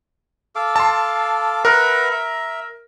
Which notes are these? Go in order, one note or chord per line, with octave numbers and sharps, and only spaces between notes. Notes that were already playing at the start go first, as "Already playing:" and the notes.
A4 F5 D6
A5 C6
A#4 B4 E5 F#5
E5